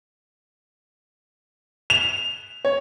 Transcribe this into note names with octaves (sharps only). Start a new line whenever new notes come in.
F7
C#5